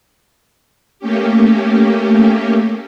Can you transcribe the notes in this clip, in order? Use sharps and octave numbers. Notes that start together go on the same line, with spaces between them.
A3 A#3 C#4 G4